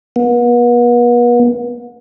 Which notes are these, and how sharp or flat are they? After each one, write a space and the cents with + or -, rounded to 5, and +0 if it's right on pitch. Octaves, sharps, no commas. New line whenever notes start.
B3 -40